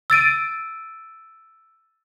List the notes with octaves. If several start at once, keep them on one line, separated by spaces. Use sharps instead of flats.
E6 A6 D7 D#7